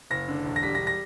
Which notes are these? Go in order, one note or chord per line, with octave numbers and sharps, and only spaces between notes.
F#1 A#6
D3
E1
A#6
G3 B6
A#6
A#6